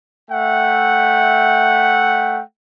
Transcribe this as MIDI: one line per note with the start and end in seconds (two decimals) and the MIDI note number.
0.31 2.42 57
0.31 2.42 76
0.31 2.42 78
0.31 2.42 79